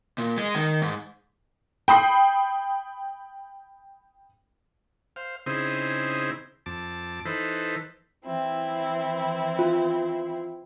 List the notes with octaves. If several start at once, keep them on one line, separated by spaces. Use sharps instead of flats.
A#2
G#3
D#3
G#2
G5 B5 D#6 C7
C5 F5
C#3 C4 D#4 E4 G#4 C5
F2 A5 D6
E3 D#4 A4 B4 C5
E3 C4 E4
F4